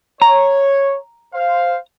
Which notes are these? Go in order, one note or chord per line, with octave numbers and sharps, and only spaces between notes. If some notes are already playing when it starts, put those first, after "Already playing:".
C#5 A#5
C5 F5